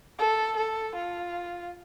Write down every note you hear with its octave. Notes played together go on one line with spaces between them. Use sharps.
A4
A4
F4